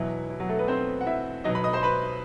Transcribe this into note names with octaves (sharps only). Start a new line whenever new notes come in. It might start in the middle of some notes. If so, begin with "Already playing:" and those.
Already playing: E2 B2 F#3 E4
E4
F#3 F#4
A3 A4
B3 B4
C4 C5
F#5
E4 E5
B2 F#3 D#4 D#5
B4 B5
D#5 D#6
C5 C6
B4 B5